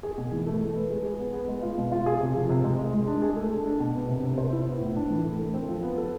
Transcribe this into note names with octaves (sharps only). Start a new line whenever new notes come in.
G#4
B2
E3
A3
G#3
B4
G#4
G#4
B3
B3
G#3
F4
B2
F4
G#4
C3
F3
C3
G#3
G#3
G#3
D4
G#4
A3
D4
D4
B2
B3
C3
C3
C5
E4
B3
A2
D4
E3
A3
A3
C4
F3
B3
A4